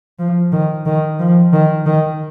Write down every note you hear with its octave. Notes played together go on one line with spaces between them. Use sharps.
F3
D#3
D#3
F3
D#3
D#3